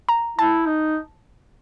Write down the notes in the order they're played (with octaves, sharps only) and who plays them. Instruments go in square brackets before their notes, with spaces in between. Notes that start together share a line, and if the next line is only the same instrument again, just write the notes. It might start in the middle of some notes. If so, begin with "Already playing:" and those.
[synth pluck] A#5
[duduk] E4 [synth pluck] A5
[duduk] D#4